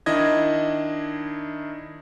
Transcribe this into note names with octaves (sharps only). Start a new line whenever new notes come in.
D#3 D4 E4 D#5 G#6